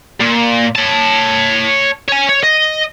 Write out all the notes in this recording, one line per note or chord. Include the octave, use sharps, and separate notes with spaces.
A#2
C#5 A5
C#5 G#5
C#5
D#5